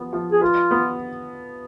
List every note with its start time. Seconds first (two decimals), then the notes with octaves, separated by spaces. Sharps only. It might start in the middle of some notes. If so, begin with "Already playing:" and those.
Already playing: F3 B3
0.13 F3
0.32 G#4
0.41 F4 B4
0.71 B3